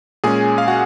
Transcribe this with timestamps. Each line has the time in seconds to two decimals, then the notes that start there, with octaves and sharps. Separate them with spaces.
0.24 A#2 G#3 C#4 G#4 G#5
0.58 F5
0.68 F#4 F#5